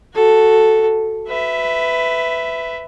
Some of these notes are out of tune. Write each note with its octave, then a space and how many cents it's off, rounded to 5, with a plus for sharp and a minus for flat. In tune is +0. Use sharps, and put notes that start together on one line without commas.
F#4 +0 A4 +0
B4 +15 E5 +0